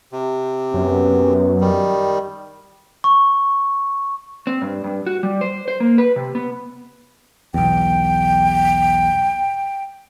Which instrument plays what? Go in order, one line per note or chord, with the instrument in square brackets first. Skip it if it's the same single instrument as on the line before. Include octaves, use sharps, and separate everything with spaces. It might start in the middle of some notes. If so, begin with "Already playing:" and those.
[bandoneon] C3
[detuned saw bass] F#2 [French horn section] B3 C#4
[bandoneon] D#3 G3
[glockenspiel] C#6
[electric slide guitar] C4
G2
G2
F#4
G3
C5
C5
A#3
B4
C3
B3
[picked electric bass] B1 E2 [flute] G5